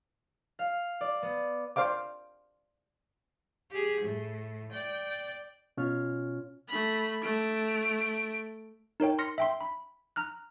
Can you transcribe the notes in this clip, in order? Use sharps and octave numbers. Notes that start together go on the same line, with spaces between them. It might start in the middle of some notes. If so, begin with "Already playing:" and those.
F5
D5
B3
C5 D5 F5 D6
G4 G#4
A2
D5 G5
B2 C#4 F4 C#5 F6
A3 B5
A3 D7
D#4 A#4 C#5 G5
C6 F6 A#6 C#7
E5 G5 C6
B5
A#5 F6 F#6